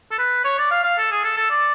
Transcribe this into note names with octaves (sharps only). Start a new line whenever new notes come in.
A4
B4
C#5
D5
F5
F5
A4
G#4
A4
A4
D5